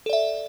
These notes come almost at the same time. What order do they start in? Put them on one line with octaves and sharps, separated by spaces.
A4 D5 E5